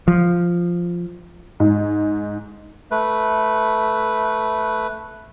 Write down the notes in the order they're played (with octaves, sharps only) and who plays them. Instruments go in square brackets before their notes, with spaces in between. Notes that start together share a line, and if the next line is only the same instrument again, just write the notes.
[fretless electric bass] F3
[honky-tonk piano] G#2
[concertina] A3 B4